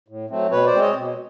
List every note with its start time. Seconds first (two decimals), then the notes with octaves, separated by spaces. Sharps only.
0.08 A2
0.29 F#3 A3 C4
0.51 B2 B4 C#5
0.66 C5 D5
0.74 G#3 C4
0.81 C#5 D#5
0.96 B2